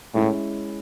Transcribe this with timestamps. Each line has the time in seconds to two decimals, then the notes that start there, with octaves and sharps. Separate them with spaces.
0.14 A2 G#3 C#4 E4